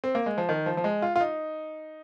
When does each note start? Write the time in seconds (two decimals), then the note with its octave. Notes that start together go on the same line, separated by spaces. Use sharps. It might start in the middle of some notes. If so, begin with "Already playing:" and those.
0.04 C4
0.15 A#3
0.26 G#3
0.38 F3
0.49 D#3
0.66 F3
0.77 F3
0.84 G#3
1.02 F4
1.16 F4
1.20 D#4